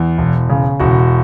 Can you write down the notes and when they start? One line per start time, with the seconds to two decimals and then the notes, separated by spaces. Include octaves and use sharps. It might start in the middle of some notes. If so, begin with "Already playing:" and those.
Already playing: E2
0.18 E1
0.49 C#3
0.80 E1 F#4